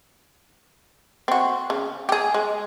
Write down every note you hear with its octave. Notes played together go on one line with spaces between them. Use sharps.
C4 F#4
C#3
G4 G#4
G#3